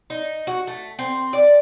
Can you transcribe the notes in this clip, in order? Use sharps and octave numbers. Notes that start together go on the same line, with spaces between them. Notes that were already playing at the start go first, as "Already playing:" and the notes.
D#4
F#4
A3
C4
D5